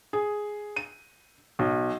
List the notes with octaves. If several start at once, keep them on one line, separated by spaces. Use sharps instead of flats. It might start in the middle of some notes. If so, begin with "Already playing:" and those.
G#4
D#7
B1